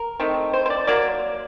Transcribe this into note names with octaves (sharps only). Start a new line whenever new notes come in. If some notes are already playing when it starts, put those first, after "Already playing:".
Already playing: A#4
D#3 A3 C4
C5
C5
D5
F#3 A#3 D5